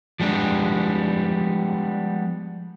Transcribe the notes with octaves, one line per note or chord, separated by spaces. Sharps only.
F3 G3 G#3 B3 D4